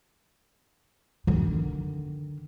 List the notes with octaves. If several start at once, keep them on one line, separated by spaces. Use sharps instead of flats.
D3 D#3